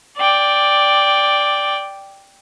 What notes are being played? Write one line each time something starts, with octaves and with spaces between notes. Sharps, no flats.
D5 G5